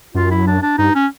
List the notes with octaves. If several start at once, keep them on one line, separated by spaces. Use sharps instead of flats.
F#2 F4
E4
D4
D4
G2 D#4
C#4